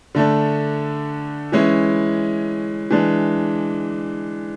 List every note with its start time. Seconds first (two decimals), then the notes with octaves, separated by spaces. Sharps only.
0.15 D3 A3 D4
1.52 E3 G#3 C#4 E4
2.90 E3 G#3 D4